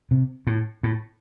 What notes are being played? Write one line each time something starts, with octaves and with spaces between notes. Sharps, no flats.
C3
A2
A2